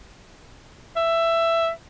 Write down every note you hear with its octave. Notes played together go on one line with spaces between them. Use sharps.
E5